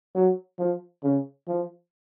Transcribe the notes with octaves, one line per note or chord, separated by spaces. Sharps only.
F#3
F3
C#3
F3